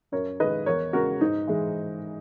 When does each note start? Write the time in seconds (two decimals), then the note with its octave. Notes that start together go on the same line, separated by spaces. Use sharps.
0.12 F#2 A#4 C#5
0.40 D#3 G#3 B4 D#5
0.66 E2 A#4 C#5
0.93 C#3 G#3 F#4 A#4
1.21 G#2 D#4
1.47 E3 G#3